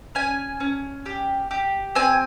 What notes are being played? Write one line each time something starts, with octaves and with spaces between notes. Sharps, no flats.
C#4 G#5
C#4
G4
G4
C4 G#5